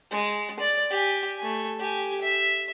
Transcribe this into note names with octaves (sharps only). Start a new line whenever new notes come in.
G#3
D5
G4 G#5
A3 G#5
G4 G#5
E5